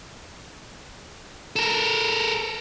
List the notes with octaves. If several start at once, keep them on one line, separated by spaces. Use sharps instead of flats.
A4 A#4